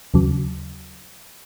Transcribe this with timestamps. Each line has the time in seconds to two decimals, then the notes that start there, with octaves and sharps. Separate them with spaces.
0.14 D#2 C#3 F#3